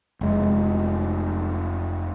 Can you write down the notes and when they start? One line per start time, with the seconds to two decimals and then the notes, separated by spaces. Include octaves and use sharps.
0.21 F1 G#3